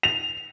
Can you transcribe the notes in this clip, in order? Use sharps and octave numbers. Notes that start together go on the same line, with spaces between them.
F7